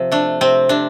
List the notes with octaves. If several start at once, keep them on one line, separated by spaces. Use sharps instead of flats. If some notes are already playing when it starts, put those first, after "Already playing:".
Already playing: C3 F3
A3 D4
C3 C4
C3 D4